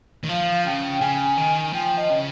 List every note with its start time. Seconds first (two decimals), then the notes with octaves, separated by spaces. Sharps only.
0.24 D#3
0.29 F3 F5
0.66 C#3 G5
1.01 C#3 G#5
1.38 D#3
1.73 F3 G5
1.97 D#5
2.10 C#3